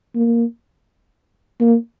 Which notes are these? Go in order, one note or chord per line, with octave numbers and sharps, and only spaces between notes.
A#3
A#3